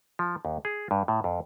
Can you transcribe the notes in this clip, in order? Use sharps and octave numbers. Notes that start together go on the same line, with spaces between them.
F3
D#2
G#4
G2
A2
F2